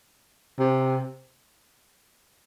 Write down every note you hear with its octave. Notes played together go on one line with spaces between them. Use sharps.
C3